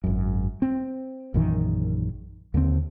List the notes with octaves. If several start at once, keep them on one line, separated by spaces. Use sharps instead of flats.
G#1 F#2
C4
A#1 F#2 D#3 E3
D#2 D3 G3 C4